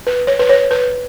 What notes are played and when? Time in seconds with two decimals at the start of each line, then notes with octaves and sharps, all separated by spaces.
0.07 B4
0.27 C#5
0.39 B4
0.49 C#5
0.71 B4